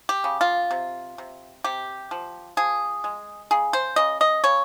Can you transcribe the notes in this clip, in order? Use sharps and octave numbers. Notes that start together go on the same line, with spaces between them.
G4
C#3
F4
C3
C3
C3 G4
F3
F3 G#4
G#3
C#3 G#4
C5
C#3 D#5
D#5
C#3 C#5